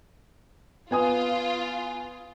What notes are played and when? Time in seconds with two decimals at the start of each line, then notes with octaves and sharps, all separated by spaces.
0.91 B3 F4 G#5 D#6